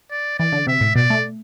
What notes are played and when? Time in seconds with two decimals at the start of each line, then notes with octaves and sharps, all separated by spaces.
0.11 D5
0.38 E3 D5
0.52 D3
0.67 C3 E5
0.81 A2
0.95 B2 D5
1.10 A3